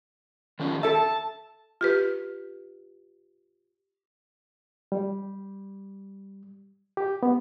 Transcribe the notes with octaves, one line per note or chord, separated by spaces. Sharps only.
D#3 F3 C#4
A4 E5 A5
F4 G4 B4
G3
G4
B3